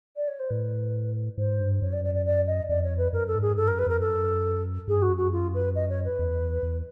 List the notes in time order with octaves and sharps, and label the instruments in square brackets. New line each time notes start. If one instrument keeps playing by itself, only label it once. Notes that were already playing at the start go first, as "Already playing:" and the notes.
[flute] D5
C#5
C5
[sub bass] A2 [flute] B4
[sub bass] G#2 [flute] C5
[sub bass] G2
[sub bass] F#2 [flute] C#5
[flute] D5
D5
D5
D5
D#5
[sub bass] F2 [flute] D5
[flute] C#5
B4
[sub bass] F#2 [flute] A#4
[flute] A4
[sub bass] G#2
[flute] G#4
[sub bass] G2 [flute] A4
[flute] A#4
[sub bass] F#2
[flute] B4
[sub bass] F2 [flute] A#4
[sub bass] F#2 [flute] A4
[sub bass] G2 [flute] G#4
[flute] F#4
[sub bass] F#2
[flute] F#4
F4
B4
D#5
C#5
B4
[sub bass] E2
E2